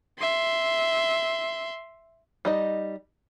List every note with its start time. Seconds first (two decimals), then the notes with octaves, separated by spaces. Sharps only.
0.18 E5 C6
2.45 G3 D#4 D#5